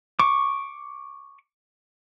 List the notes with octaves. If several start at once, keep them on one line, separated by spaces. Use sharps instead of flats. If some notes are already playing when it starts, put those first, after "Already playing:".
C#6 D6